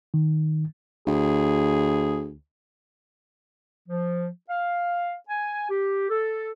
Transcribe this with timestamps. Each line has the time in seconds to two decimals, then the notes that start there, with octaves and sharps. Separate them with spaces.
0.14 D#3
1.07 D2 G#4
3.88 F3
4.49 F5
5.29 G#5
5.69 G4
6.09 A4